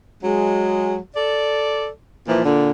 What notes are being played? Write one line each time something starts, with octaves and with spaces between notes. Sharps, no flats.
F#3 G#3
A4 D5
A#2 E3 F3
A#2 D3